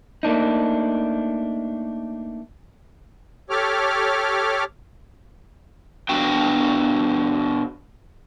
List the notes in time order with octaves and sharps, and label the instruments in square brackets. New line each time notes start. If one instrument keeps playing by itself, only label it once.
[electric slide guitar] A3 A#3 D4 D#4
[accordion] G4 A4 C#5 D6 F6
[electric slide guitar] B2 D4 F#4 G5